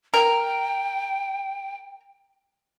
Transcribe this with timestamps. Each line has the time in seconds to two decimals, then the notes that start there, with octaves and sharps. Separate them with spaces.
0.14 A#4 G5